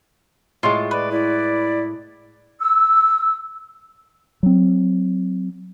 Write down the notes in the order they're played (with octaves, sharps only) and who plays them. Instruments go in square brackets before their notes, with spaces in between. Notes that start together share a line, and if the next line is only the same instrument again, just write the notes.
[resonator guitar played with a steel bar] A2 G#3 [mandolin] F4
[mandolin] B4 [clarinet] D5
[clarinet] E4 [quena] D5
[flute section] E6
[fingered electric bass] F#3 C4